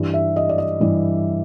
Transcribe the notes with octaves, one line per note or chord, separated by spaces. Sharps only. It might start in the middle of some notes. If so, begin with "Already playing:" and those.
Already playing: G2 E3 G3
E5
D#5
D5
D#5
G2 E3 G3